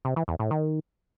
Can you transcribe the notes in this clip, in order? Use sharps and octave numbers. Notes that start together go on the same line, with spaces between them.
C3
E3
E2
A2
D#3